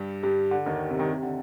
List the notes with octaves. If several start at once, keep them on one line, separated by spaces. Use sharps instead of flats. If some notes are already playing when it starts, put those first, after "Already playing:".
Already playing: G2 G3
G2 G3
D3
D#2 D#3
C3
D#2 D#3
C3
D3